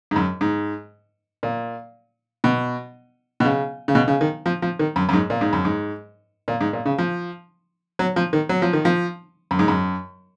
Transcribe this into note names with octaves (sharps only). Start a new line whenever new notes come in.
G#2
F#2
G#2
A#2
B2
B2
C#3
C#3
B2
C#3
D#3
F3
F3
D#3
F#2
F#2
G#2
A#2
G#2
F#2
G#2
A#2
G#2
A#2
C#3
F3
F#3
F3
D#3
F#3
F3
D#3
F3
F#2
G#2
F#2